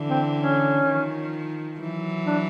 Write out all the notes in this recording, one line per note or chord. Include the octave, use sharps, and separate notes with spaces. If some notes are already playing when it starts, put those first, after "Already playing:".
Already playing: D3 E3
C4
C#4
D#3 F3
E3 F#3
D4